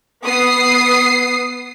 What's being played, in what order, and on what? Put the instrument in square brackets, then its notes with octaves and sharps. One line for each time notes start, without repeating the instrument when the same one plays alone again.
[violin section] B3 D#6 C7